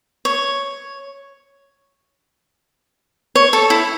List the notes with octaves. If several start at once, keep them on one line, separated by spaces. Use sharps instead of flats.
C#5
C#5
A4
E4